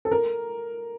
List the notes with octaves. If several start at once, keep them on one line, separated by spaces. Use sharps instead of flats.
A4
A#4